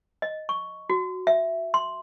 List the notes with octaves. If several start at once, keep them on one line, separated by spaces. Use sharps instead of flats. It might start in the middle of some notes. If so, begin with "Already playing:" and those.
D#5
C#6
F#4
E5
C6